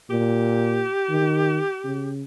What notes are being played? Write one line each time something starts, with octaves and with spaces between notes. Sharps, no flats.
A#2 G4
D#3
C#3